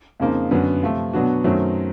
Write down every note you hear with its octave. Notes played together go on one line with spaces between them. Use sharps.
F2 C#3 F3 A#3 D#4
F#2 D3 F#3 B3
C3 F3 A3
B2 F#3 B3 D4 F#4
F#2 D#3 F#3 A3 C4